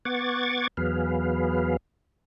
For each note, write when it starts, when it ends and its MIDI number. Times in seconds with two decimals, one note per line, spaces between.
0.05 0.67 59
0.05 0.67 78
0.05 0.67 85
0.05 0.67 86
0.05 0.67 92
0.05 0.67 93
0.77 1.77 40
0.77 1.77 54
0.77 1.77 59
0.77 1.77 68
0.77 1.77 71
0.77 1.77 77